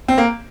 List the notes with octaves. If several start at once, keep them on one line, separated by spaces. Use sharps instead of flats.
C4
A#3